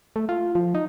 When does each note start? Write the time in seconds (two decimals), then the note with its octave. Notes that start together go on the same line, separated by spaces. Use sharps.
0.16 A3
0.29 F4
0.55 F3
0.75 D#4